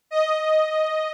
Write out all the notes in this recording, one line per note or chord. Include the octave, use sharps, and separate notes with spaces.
D#5